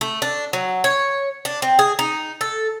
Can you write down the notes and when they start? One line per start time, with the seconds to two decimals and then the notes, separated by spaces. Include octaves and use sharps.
0.01 A3
0.22 D4
0.53 F#3
0.84 C#5
1.45 D4
1.62 C4
1.79 G#4
1.99 D#4
2.41 A4